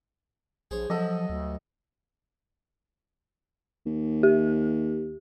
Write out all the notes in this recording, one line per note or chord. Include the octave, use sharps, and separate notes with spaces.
A#1 G#4 C5 C#5
G2 F3 F#3 A4 D#5
D2
D#2
G4